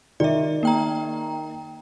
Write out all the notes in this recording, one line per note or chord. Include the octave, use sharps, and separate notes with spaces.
D#3 D5 E5
A#3 G5 A#5